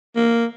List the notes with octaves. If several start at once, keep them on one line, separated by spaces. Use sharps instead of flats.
A#3